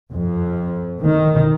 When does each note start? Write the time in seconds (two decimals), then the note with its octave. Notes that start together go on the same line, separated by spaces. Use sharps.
0.11 F2
1.02 D#3